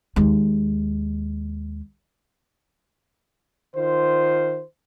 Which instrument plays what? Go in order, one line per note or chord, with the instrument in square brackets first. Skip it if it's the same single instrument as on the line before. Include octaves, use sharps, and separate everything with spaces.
[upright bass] D#2 G#3
[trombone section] D#3 F4 C5